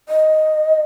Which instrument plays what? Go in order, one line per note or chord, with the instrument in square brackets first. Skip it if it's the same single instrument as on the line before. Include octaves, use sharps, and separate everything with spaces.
[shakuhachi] D#5